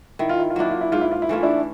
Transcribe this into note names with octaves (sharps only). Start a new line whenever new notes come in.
D#3 E4
F4
E4
F4
F#3 A#3 D4 E4
F4
E4
G#2 F4
E4
F4
E4
E3 A3 C#4 F4
D4 E4